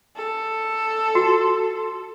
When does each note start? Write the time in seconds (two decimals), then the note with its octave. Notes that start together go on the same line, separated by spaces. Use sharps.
0.16 A4
1.15 F#4